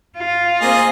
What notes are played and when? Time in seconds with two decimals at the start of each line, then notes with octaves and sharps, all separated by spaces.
0.17 F4
0.61 A#3 C4 G#4 D#5